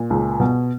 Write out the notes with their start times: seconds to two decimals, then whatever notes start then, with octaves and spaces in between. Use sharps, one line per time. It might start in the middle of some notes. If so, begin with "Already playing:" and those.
Already playing: A#2
0.10 C#2
0.40 B2